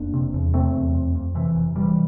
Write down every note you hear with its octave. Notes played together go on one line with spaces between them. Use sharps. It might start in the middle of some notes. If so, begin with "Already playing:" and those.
Already playing: F1 A#3 D4
C3
E2
C3 A3 C4
E2
F2
F2
C3 E3
F1
C3 E3 G3